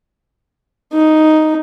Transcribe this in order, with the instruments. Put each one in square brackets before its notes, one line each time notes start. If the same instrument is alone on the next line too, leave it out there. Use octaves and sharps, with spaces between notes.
[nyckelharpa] D#4